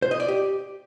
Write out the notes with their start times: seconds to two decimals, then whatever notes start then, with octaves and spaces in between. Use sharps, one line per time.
0.02 C5
0.11 D#5
0.20 D5
0.28 G4